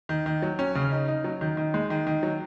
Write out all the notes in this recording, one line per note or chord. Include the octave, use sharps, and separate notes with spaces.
D#3
D#3
F#3
C#4
C#3
D#4
D#4
F#3
D#3
D#3
G#3
D#3
D#3
F#3